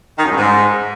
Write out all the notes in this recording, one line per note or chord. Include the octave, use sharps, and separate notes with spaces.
D#3
F#2
G2
G#2